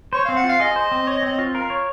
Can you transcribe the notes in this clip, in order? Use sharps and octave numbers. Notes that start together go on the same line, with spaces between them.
C5 C#5
C4 F5
F#5
F4 F5
G#4 D#5
C5
C4
C#5
C4
F4
A#4 F5
C#5